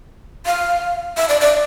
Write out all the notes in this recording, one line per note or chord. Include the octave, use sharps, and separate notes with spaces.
F5
E5
D5
D5